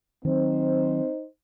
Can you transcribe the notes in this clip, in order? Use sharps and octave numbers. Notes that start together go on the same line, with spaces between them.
D#3 F#3 C4 D#4 C5